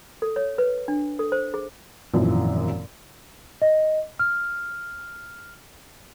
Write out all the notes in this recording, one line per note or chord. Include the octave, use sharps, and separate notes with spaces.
A4
C#5
B4
D4
A4
C5
G#4
G#1 F#2 A#2 E3 F3
D#5
F6